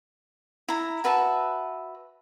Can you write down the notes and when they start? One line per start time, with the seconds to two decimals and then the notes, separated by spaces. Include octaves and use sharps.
0.68 E4 A#5
1.04 F#4 B4 E5 A5